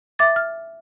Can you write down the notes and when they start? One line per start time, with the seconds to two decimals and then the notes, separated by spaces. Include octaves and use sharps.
0.19 E5 D6 A6
0.36 F6